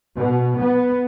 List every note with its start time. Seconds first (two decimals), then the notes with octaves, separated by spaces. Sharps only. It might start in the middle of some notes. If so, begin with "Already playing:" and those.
0.17 B2
0.58 B3